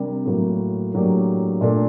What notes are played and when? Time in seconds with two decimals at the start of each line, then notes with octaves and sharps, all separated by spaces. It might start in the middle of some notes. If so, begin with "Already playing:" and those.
Already playing: C3 G3 D4 G4 A#4
0.26 A2 F#3 A#3 F#4
0.94 A2 F#3 A#3 D4 G4
1.61 A#2 A3 D4